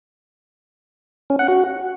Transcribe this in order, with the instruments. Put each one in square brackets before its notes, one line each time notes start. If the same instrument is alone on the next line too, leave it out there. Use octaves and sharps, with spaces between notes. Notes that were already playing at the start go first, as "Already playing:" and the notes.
[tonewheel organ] C#4
F#5
F#4